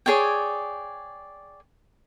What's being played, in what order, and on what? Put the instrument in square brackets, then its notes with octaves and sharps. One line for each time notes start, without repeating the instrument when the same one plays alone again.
[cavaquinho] G#4 C#5 D5 G5